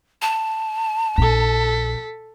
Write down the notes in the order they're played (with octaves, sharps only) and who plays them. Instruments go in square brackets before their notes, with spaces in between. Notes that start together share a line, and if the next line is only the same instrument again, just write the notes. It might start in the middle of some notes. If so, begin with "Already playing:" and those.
[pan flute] A5
[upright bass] A#1 [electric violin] A4 B6